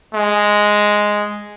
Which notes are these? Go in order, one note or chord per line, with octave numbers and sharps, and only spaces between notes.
G#3